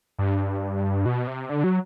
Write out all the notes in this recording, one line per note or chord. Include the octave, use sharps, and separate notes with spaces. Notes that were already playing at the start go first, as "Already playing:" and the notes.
G2
B2
C3
D3
F#3